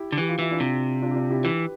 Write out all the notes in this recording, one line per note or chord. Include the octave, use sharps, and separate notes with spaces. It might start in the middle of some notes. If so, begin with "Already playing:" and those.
Already playing: E4 G4
D3
E3 G4
F4
E3 E4
D4 F4
C3
D4 F4
G4
D4 F4
E4 G4
E3 G4 B4